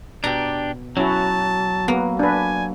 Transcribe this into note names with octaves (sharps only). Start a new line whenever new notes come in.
B2 D4 G4 A#5
F#3 C#4 E4 F#4 A5
A#3 B3
D4 B4 G#5